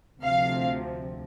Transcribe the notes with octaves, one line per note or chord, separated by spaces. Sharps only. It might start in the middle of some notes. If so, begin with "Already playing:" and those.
D2 C3 F3 F5